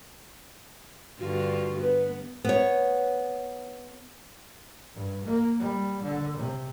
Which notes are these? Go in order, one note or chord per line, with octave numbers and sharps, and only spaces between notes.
G2 D3 F4 F#4
B3 B4
B3 C#5
G2
A#3
G3
D3
C3